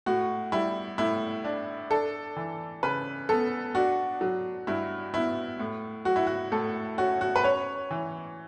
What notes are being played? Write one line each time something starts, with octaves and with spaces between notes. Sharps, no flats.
A2 F#4
G3 E4
A2 E4
D4
D4 A4
E3
C#3 B4
B3 A4
D4 F#4
F#3
G2 E4
B3 E4
A2
F#3 F#4
E4
F#4
A2 A4
C#4 F#4
F#4
B4
C#4 C#5
E3